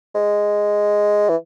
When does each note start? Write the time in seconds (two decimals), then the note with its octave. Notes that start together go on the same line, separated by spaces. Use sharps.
0.15 G#3
1.29 E3